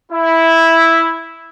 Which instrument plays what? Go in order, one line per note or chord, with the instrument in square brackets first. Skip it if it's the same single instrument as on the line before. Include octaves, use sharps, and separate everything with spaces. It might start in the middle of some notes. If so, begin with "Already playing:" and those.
[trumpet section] E4